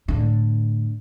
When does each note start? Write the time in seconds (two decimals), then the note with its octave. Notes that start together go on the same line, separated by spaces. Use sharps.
0.08 A2 D3